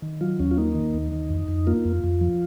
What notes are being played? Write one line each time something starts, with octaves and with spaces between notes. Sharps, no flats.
D#3
F#3 F4
D#2 C#4
F4
A#3 D#4
D#3
D#2
D#3
F2
F2
A#3 F4
F2
F2
F3